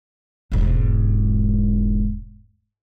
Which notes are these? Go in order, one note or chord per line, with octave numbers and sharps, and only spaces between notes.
E1 G#2